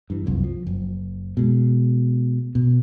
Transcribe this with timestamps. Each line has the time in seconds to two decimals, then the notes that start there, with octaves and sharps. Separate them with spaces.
0.10 G2 E3
0.26 F#1 C2 F2
0.44 F3
0.67 F#1
1.37 B2 G#3
2.55 B2